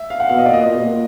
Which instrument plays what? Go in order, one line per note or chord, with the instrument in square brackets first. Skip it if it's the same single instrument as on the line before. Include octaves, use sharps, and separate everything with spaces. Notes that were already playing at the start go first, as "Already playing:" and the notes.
Already playing: [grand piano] E5
F5
F#5
[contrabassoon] B2 [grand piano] F5
[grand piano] D#5
[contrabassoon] A#2 [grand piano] D5
[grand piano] D#5
[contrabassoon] A#2
B2
A#2